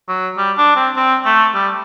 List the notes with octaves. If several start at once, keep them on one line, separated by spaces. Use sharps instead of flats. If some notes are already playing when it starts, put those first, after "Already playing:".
F#3
G3
D4
C4
C4
A3
G3